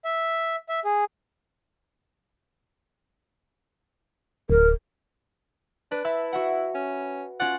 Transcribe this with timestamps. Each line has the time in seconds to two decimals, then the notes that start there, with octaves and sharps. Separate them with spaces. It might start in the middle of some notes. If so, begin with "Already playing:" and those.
0.05 E5
0.69 E5
0.85 G#4
4.50 D1 A#4
5.92 D4 B4
6.05 E4 E5 A5 B5
6.33 F#4 E5 F#5
6.75 C#4
7.40 C#4 F4 D5 F#5